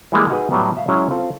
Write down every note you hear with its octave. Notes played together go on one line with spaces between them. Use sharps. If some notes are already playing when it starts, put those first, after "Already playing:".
E3 G3 G#3 A#3 G#4
D#4 F#4 G#4 B4 D#5
A2 F#3 G3 B3
E5 F5
F#3 G#3 C#4 E4 E5
C4 F4 A4